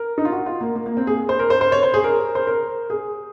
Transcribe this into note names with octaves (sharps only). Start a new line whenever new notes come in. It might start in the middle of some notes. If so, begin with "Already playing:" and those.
Already playing: A#4
D#4
F4
F#4
F4
A#3
A#3
A#3
C4
G#4
C5
A#4
C5
C5
C#5
C5
G#4
A#4
C5
A#4
G#4